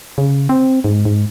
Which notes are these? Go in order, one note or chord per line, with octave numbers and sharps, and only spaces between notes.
C#3
C4
G#2
G#2